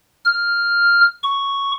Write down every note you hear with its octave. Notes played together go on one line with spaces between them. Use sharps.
F6
C#6